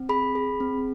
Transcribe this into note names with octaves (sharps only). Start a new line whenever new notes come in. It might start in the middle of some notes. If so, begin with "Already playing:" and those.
Already playing: C4
G#4 B5
G#4
C4